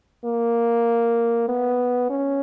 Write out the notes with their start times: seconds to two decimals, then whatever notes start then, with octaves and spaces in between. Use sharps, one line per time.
0.25 A#3
1.48 B3
2.10 C#4